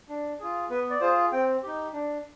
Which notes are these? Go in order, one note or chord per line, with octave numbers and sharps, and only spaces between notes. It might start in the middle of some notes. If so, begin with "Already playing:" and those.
D4
F4 G#4
B3 B4
D5
F4 G#4 C5
C4 G5
D#4 G4
D4